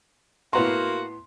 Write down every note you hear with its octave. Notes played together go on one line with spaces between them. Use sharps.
A2 A#3 B3 F#4 A#5 C6